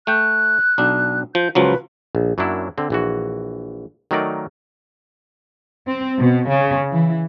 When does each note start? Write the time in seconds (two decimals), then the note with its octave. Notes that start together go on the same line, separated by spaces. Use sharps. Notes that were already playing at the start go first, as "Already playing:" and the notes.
0.07 A3 G5 F#6
0.78 B1 D4
1.35 F3 G6
1.55 C#2 F3 F#3 B4
2.15 A#1
2.38 F#2 F#3 A#3 D4 E4
2.78 D3 C4
2.90 A#1 E3 F#4
4.11 D#3 F#3 A3 D#4 A#4 D5
5.87 C4
6.18 B2
6.48 C#3
6.91 E3